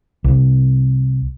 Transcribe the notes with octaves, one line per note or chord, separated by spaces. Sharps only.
C2